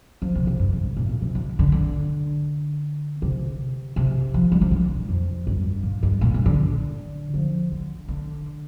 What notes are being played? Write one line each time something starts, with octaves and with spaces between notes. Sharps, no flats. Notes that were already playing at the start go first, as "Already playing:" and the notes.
F3
C3
C3
G2
G2
G2
A#2
A#2
C3
D3
D3
D3
C3
C3
F3
G3
F3
D3
A#2
F2
G2
A#2
G2
A#2
G2
D3
F3
D3
D3